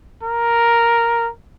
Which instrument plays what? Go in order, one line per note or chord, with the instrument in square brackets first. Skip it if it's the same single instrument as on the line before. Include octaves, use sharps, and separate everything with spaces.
[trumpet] A#4